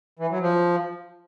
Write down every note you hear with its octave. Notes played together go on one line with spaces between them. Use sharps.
E3
F#3
F3